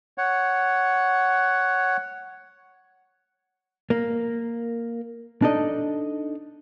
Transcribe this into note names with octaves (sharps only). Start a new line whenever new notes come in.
C#5 F#5
A#3
D4 D#4 A4 D#5